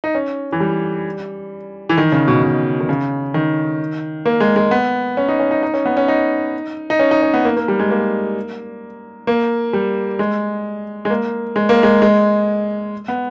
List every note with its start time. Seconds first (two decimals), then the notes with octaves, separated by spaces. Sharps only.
0.04 D#4
0.15 C#4
0.52 E3
0.60 G3
1.89 E3
1.97 D#3
2.12 C#3
2.28 B2
2.43 B2
2.80 D#3
2.89 C#3
3.34 D#3
4.26 A#3
4.40 G#3
4.56 G#3
4.71 B3
5.17 C#4
5.28 D#4
5.40 C#4
5.51 D#4
5.63 D#4
5.74 C#4
5.85 B3
5.97 C#4
6.08 D#4
6.90 D#4
6.99 C#4
7.11 D#4
7.22 C#4
7.34 B3
7.45 A#3
7.57 A#3
7.68 G3
7.79 G#3
7.91 A#3
9.27 A#3
9.73 G3
10.19 G#3
11.05 G#3
11.10 A#3
11.56 G#3
11.69 A#3
11.83 G#3
12.02 G#3
13.08 B3